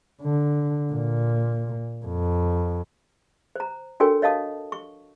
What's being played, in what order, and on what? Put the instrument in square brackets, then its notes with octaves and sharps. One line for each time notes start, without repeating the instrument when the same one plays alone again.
[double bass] D3
A#2
F2
[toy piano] C5 A#5
D4 F#4 A4 A#4 C#5 G5
C#5 D#5 F5 A5 D#6
C#6